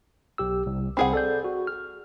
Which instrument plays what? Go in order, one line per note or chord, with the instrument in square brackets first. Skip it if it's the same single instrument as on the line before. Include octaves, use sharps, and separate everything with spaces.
[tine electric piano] B1 G4 E6
C2
[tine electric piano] C2 B5 [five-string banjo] C4 G#4 F#5
[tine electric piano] A4 D5 G6
F#4
F6